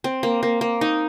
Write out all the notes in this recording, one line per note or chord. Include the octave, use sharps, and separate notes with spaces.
C4
A#3
A#3
A#3
D#4